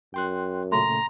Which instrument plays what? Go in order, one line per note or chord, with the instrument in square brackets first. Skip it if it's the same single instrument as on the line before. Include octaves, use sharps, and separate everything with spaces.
[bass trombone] F#2 [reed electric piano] G5 C6 F#6
[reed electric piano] A#2 C#3 A3 [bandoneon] A#5 [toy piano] C6